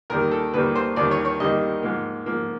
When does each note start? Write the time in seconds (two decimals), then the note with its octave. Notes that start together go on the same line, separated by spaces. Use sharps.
0.10 D#2 D#3 G3 A#3 A#4
0.31 A4
0.54 D#2 D#3 G3 A#3 B4
0.75 C5
0.96 D#2 D#3 G3 A#3 D5
1.11 C#5
1.25 C#5
1.40 D#2 D#3 G3 A#3 D#5
1.83 G#2 F3 A#3
2.26 G#2 F3 A#3